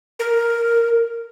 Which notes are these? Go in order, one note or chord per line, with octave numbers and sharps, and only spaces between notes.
A#4